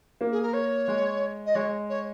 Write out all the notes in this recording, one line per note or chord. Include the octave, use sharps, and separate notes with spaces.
A#3
G#4
A#4
C#5
G#3
D#5
G#3 C#5
C#5